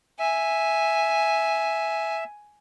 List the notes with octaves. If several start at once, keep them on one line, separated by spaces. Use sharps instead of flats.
E5 G#5